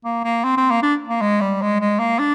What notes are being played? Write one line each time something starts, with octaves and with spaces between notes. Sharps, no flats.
A#3
A#3
C4
C4
A#3
D4
A#3
G#3
G3
G#3
G#3
A#3
D4